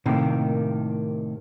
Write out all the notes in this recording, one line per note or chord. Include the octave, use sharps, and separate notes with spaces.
A2 C3 D#3 A#3